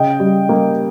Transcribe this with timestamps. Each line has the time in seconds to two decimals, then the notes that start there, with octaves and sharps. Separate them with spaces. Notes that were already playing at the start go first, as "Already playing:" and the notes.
Already playing: C#3 D#5 G5
0.20 G3
0.49 A#3